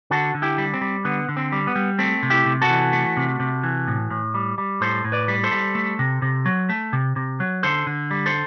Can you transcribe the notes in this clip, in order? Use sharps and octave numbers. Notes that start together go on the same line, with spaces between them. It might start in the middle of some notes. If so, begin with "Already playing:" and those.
D3 F#4 A4
D3
E4 G4
G3
C4
G3
D3 B3
D3
C4
G3
B3
G3
A3 C4
C3
E4 G4
C3
F#4 A4
E3
A3
C3
C3
E3
A2
A2
G3
G3
A2 A4 C5
A2
B4 D5
G3
A4 C5
G3
A3
C3
C3
F#3
A3
C3
C3
F#3
D3 A4 C5
D3
G3
A4 C5